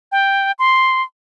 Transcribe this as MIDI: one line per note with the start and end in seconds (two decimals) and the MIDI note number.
0.12 0.51 79
0.59 1.02 84